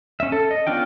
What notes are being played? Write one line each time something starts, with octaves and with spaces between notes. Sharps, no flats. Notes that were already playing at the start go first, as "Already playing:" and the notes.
C#4 E5
A4
D#5
B3 C#4 D4 F4 G5